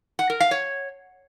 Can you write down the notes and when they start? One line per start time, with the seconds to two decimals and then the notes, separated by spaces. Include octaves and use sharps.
0.19 F#5
0.30 A#4
0.40 F5
0.51 C#5